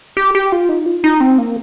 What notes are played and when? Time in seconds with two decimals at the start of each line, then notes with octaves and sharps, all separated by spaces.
0.17 G4
0.35 G4
0.52 F4
0.69 D#4
0.86 F4
1.04 D#4
1.20 C4
1.38 A#3